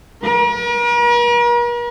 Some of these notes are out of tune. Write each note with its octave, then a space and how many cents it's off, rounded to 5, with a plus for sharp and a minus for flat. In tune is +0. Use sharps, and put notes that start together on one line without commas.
A#4 +45